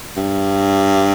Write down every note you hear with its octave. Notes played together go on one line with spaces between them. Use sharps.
G2